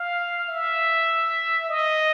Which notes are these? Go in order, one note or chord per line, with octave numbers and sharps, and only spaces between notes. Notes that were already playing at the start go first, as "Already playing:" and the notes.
Already playing: F5
E5
D#5